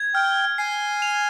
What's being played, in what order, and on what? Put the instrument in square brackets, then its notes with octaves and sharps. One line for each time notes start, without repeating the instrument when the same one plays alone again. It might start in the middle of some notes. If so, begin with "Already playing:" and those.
Already playing: [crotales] G#6
[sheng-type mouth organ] G5 [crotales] F6
[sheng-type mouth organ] G#5 [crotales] C7
[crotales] F7